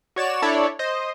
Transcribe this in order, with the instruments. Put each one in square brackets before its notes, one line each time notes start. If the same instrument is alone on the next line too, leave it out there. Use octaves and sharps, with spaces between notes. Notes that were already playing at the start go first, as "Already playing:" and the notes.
[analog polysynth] F#4 C#5 D5 E7
D4 E4 A4 C#5 D5
C5 D#5